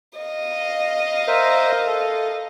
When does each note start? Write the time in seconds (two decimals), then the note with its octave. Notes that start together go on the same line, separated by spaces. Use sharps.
0.19 D#5 F5
1.27 A#4 C5 E5
1.87 A4